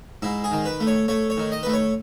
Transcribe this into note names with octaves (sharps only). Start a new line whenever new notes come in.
G#2 E4
G#4
D#3
B4
A3
C#5
A3 C#5
C#5
D#3
D#5
A3 B4
C#5